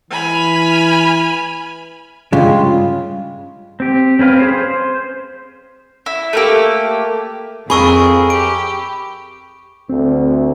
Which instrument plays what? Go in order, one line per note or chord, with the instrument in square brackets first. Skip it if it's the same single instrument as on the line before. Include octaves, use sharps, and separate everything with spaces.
[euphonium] E3 [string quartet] G#5 B5 F6
[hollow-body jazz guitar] G2 C#3 G#3 [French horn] F4
[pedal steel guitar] C4 G4
C4 C#4 B4 F5
G#4 C5
C5
[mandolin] E4
A3 A#3 G4
[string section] F2 [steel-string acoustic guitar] G#4 A#4 [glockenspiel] B5 C#6 E6
[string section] G4 [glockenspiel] D7
[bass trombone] D2 [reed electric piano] C4